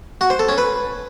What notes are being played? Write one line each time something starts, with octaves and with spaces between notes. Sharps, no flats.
F#4
C5
A4
C#4
B4